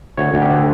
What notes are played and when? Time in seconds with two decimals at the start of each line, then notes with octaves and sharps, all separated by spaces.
0.17 D2 C#5
0.34 D2
0.42 G4
0.50 D3